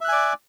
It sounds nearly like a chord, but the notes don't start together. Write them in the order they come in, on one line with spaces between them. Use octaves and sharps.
E5 F#6 G#5 D5